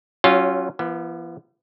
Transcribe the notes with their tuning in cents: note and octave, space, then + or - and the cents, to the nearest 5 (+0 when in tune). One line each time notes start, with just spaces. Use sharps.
F#3 +25 C#4 +0 F4 +0
E3 +45 B3 -30